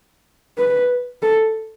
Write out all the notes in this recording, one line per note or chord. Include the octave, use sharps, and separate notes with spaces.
B4
A4